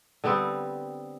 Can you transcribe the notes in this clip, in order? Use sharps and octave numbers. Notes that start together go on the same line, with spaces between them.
D3 G3 B3 C4